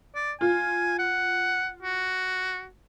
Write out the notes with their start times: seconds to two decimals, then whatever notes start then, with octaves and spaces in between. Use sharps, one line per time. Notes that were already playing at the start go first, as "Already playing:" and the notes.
0.15 D5
0.41 F4 G#5
0.99 F#5
1.83 F#4